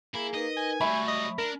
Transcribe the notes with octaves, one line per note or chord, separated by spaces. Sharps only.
A#3 E4 G#4 G#5
D#4 A#4 B4 D#5
G#5
F#3 G3 A3 E5 B5 C#6
D#5
D4 A#4